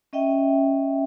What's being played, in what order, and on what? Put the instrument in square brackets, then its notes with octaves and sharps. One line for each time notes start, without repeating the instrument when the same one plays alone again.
[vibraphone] C#4 D#5 E5 G5